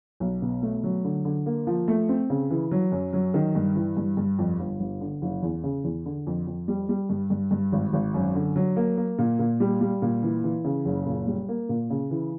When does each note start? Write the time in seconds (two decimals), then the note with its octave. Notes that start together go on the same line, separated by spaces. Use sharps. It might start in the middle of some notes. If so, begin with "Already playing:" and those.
0.20 B1
0.42 B2
0.62 A3
0.83 F#3
1.04 D3
1.25 D3
1.46 A#3
1.67 F3
1.88 A3
2.09 C4
2.30 C#3
2.50 E3
2.71 F#3
2.92 F#2
3.13 F#3
3.34 D#3
3.55 G2
3.75 E3
3.97 G2
4.17 G2
4.39 F2
4.59 G1
4.80 G1
5.01 D3
5.22 F#1
5.42 E2
5.64 C#3
5.84 E2
6.06 D3
6.27 F2
6.47 F2
6.68 G3
6.89 G3
7.09 G2
7.30 G2
7.51 G2
7.72 G#1
7.93 G#1
8.14 F#2
8.35 D3
8.56 F#3
8.76 A#3
8.97 A#3
9.18 A#2
9.39 A#2
9.60 G3
9.81 G3
10.02 A#2
10.23 E3
10.44 E3
10.64 C#3
10.85 F#1
11.06 A#2
11.27 G3
11.49 A#3
11.69 A#2
11.90 C#3
12.11 E3